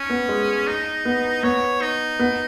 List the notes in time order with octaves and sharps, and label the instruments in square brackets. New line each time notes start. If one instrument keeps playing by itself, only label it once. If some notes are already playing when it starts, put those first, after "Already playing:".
Already playing: [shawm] C#4
[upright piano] B3
G#3
[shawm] D#4
[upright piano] B3
[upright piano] B3 [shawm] C#5
[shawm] D#4
[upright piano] B3